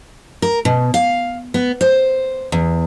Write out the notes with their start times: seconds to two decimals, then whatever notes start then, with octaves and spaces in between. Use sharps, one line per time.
0.42 A#4
0.65 B2
0.94 F5
1.54 B3
1.81 C5
2.52 E2